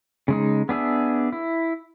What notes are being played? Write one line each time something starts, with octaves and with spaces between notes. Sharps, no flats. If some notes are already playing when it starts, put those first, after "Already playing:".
C#3 G#3 D#4
B3 D4 G#4 E5
E4